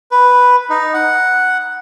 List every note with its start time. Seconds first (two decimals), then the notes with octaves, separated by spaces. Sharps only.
0.12 B4
0.70 D#4
0.94 F#5